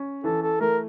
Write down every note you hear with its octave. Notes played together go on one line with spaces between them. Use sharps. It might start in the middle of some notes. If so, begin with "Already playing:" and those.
Already playing: C#4
E3 A4
A4
A3 A#4